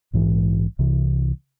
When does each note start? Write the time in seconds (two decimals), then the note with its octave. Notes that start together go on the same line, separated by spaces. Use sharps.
0.13 A#1 G#2 E3
0.79 C2 C3 E3